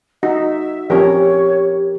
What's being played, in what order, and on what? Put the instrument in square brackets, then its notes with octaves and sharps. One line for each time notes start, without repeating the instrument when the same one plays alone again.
[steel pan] D#4 [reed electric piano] F#4 [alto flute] E5
[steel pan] F3 C4 C#4 [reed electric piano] G4 A#4 [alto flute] C#5